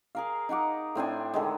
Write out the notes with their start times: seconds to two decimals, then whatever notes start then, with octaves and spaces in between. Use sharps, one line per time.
0.15 G#4 A#4 F5
0.49 D#4 A#4 F#5 D6
0.95 A2 C4 D4 G#5
1.34 D3 D#3 G#3